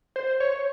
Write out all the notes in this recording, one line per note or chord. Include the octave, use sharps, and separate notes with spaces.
C5
C#5